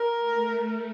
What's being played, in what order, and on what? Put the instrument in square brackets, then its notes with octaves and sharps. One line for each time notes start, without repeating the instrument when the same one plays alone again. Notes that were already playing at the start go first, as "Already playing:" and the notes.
Already playing: [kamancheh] A#4
[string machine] A3